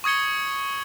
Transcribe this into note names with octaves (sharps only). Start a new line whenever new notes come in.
C#6 D#6 G#6 C#7 G7